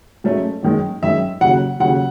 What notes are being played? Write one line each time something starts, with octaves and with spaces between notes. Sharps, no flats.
G#2 F#3 A3 C#4
F#2 D#3 G#3
F#2 D#3 G#3 E5
D#2 C#3 F#3 F#5
D#2 C#3 F#3 F#5